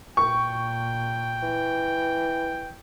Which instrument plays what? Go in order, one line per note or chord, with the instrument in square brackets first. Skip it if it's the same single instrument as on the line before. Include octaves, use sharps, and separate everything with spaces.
[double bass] A#2 [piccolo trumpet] G5 [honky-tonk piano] C#6
[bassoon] E3